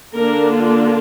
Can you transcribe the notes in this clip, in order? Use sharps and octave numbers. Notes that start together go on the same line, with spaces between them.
D3 A#3 D4 A#4
F4